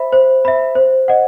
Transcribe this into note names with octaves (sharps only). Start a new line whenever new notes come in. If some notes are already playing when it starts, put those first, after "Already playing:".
Already playing: C5 E5 B5
C5
E5 B5
C5
D#5 F#5